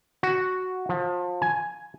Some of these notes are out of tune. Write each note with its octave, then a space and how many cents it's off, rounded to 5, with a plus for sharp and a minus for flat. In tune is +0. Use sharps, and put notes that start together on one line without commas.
F#4 +0
F3 +30
G#5 +10